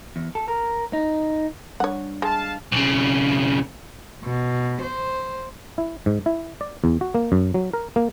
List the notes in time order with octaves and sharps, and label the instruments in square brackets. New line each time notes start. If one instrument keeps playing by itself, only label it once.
[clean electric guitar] E2
A4
A#4
D#4
[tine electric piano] G3 D4 [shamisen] C#5 F#5
[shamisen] G#3 [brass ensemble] F5 A5
[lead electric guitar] B1 C#3
[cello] B2
C5
[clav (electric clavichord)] E4
G#2
E4
D5
E2
F#4
A#3
F#2
F#3
A#4
A#3